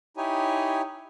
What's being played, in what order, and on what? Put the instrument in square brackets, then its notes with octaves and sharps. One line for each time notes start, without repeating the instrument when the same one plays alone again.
[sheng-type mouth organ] D#4 E4 G4 C#5 G#5